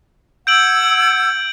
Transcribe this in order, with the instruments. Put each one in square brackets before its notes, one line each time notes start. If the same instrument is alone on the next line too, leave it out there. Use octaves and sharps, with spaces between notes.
[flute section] F#5 E6 G#6 [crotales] G6 D7 F#7